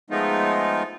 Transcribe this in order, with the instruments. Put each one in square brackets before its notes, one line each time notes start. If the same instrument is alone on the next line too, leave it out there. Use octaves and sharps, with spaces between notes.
[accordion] F3 G#3 A3 B3 D#4 F4